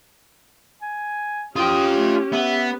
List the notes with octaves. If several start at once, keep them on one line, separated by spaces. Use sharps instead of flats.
G#5
C#4 F4 G4 G5 D#6
A3
B3 E5